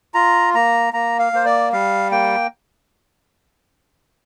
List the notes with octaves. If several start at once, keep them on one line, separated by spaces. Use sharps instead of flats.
F4 A#5
A#3 A#5
A#3 A#5
F5
A#3 C5
D5
G3 F5
A#3 G5